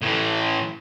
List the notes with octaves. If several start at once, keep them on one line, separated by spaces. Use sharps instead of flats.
A2 E3